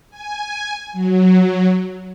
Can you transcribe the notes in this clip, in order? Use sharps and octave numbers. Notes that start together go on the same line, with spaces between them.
G#5
F#3